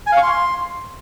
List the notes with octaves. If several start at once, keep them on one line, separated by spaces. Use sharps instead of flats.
G#5
F5
C#6
C6